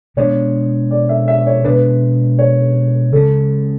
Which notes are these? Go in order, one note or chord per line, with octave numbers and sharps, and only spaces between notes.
B2 G#3 B3 D4 C#5
D5
E5
E5
C#5
B2 G#3 B3 D4 B4
C#5
C#3 G#3 C#4 A4